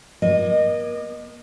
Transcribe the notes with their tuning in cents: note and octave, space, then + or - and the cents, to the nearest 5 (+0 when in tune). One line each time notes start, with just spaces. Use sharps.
A#3 +35 D#5 -15